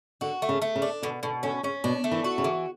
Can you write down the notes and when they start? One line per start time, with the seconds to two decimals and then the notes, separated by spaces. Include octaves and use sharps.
0.21 D3 F#4
0.42 A3
0.49 C#3
0.62 A3
0.76 C#3
0.82 D4
1.03 B2 D3
1.23 B2 D3
1.43 D3 C#4
1.63 C#3 C#4
1.84 B2 D4
2.04 A3
2.11 E3
2.24 F#4
2.38 C#3
2.44 E3